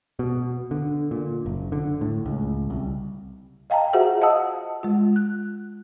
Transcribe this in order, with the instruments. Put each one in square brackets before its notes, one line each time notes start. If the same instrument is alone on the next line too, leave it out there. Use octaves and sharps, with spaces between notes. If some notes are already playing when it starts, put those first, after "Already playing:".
[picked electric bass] B2
D3
A#2
F#1
D3
A2
C#2
C2
[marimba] D#5 F5 G5 A5 A#5
F4 F#4 G#4 C5 E5 F#5
D#5 F5 F#5 A5 D#6 E6
G#3 F4
F#6